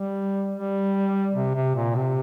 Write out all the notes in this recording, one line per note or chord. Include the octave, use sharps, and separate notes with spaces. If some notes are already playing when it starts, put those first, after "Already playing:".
Already playing: G3
G3
C3
C3
A#2
C3